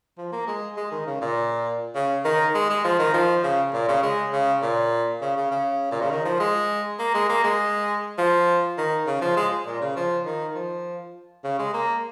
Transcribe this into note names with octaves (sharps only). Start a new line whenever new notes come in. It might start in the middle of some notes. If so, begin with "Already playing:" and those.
F3
A#3
G#3
G#3
D#3
C#3
A#2
C#3
D#3
G#3
G#3
F3
D#3
F3
C#3
A#2
C#3
G#3
C#3
A#2
C#3
C#3
C#3
A#2
C#3
D#3
F3
G#3
A#3
G#3
A#3
G#3
F3
D#3
C#3
F3
G#3
A#2
C#3
F3
D#3
F3
C#3
G#3
A#3